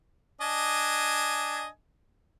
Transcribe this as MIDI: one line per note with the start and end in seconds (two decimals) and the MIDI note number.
0.41 1.68 62
0.41 1.68 75
0.41 1.68 80